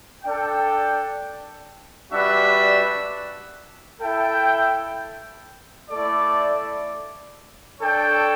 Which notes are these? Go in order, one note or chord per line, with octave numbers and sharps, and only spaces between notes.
D4 A4 D5 G5
G3 D4 F#4 B4 E5
E4 A4 E5 G5
A3 E4 A4 D5
D4 A4 C#5 G5